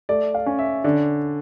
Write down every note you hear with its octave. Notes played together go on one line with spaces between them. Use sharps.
A3 D5
F5
C#4
E5
D3 D5